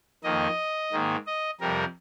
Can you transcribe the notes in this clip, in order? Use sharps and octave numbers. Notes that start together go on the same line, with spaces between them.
F2 D#3 A#3 D#5
G#2 D#3 A#3
D#5
F2 C3 G3 A#4